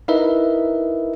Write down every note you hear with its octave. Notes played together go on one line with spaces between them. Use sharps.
D#4 E4 A#4 B4 D#5 E5